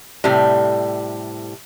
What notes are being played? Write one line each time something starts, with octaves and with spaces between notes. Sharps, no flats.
A2 C3 G3